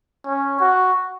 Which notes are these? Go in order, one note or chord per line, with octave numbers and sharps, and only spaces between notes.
C#4
F#4